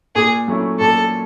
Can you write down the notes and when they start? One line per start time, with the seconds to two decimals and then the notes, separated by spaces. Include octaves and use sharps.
0.15 A#2 G#4
0.48 F#3 A3 C#4 E4
0.80 A#2 A4